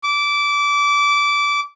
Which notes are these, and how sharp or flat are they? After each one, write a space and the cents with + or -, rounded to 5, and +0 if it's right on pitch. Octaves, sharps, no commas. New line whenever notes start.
D6 -20